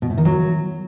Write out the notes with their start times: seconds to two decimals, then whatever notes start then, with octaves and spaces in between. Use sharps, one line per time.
0.02 B2
0.10 A2
0.18 D#3
0.25 F#3